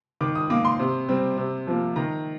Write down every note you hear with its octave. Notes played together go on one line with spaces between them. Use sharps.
D#3 D6
D#6
A#3 D6
C6
C3
G3 C4
C3
F3 A#3
D#3 A#5